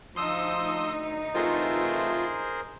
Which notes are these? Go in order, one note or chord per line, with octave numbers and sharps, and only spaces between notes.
D2 F3 D#4 C6 D#6 E6
C3 E3 A3 F4 G#4 A#4 C5